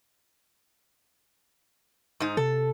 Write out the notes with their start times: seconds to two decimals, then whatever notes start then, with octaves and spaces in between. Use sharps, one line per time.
2.20 G#2 D#4
2.37 C3 A4